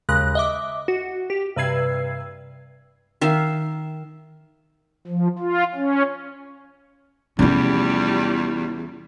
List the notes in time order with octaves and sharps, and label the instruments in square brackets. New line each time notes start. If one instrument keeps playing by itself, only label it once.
[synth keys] D#2 C#3 G#3 F#6 A#6
D#5 E5 D6
F#4
G4
G2 C3 B4 E6 G#6 C7
[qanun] D#3 E5 F5
[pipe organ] F3
F4
C#4
[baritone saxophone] E2 [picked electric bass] C3 F3 A3 [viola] G3 G4 [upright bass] C#4 F4